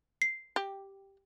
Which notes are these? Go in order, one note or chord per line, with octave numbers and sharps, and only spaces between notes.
C7
G4